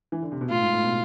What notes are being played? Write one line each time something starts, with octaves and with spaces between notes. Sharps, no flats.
E3
D3
C3
B2
A2 F4
G#2
A2
B2